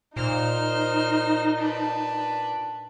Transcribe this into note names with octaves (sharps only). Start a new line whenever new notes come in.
A#2 D#4 C5 F6
D4 B4